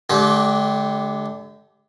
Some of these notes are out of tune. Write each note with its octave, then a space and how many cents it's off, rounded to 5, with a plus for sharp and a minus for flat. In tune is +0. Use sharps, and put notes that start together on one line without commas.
D3 -20 G#3 +40 G4 +0